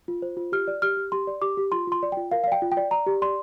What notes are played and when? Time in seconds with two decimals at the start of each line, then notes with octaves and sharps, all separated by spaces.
0.08 F4
0.22 C5
0.37 F4
0.52 G4 F6
0.68 D5
0.82 G4 F6
0.97 G4
1.12 G4 C6
1.27 D5
1.42 G4 D6
1.57 G4
1.72 F4 C6
1.87 F4 C6
2.03 D5
2.12 F4 G5
2.31 A#4 F5
2.44 F5
2.47 D5 G5
2.62 F4
2.72 G5
2.77 D5
2.91 D5 A#5
3.06 G4
3.22 D5 C6